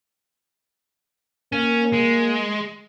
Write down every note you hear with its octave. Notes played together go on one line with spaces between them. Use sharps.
A#3 C#4
G#3